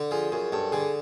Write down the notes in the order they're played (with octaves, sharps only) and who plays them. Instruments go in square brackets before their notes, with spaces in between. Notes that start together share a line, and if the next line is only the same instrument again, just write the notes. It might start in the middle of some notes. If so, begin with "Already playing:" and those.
Already playing: [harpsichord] D3
[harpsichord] F3 [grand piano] G#4
[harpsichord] F#2 [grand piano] G#4
[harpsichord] G2 [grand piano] A4
[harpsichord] D3 [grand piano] G#4